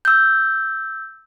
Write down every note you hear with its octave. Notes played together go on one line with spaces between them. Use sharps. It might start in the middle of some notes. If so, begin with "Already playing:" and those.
E6 G6